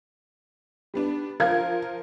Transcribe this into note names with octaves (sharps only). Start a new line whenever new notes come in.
G3 B3 D4
F3 F4 A#4 F5 G#6